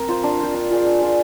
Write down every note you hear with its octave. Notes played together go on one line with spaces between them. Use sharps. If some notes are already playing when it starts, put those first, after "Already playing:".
Already playing: C4 A#4
F4 C5
D4
F4 C5
D4
F4 G#4 D5
D4
F4 G#4 D5